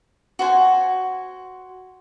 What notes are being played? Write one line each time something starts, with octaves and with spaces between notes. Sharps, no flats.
F#4 C5 G#5